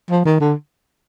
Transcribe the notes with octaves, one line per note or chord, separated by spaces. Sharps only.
F3
D#3
D3